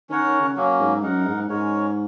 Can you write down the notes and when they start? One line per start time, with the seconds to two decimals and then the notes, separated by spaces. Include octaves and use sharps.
0.09 D#3 C#4 A#4 C#5 F#5
0.25 D#3
0.40 C#3
0.56 F#3 A#3 C#4
0.79 G#2
1.03 F#2 D#4 A#4 F#5
1.26 G#2
1.49 G#2 G#3 C#4 A#4 C#5